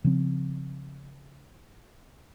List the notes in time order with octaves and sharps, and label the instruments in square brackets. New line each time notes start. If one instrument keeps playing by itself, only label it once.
[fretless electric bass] C#3 F3 C4